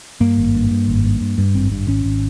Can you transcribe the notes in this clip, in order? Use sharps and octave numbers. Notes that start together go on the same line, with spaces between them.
G2 A#3
G#1
G2
G2
G#1
G2
G2
G2
G#1 C4
G2
G#1 C#4
G#1